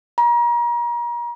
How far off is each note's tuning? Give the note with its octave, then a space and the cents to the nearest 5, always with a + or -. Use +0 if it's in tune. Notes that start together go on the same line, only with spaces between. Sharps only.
A#5 +35